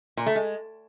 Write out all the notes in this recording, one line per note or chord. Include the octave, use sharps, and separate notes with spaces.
A#2
A3
G#3